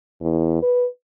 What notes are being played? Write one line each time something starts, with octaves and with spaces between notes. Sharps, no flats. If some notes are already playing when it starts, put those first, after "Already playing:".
E2
B4